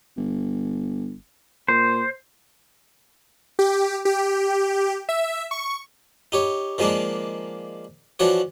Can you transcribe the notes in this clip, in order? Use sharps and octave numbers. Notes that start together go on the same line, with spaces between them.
G1
A#2 C5
G4
G4
E5
C#6
D#4 G4 C#5
D#3 F3 G#3 A#3 D4
E3 F3 D4 F#4 C#5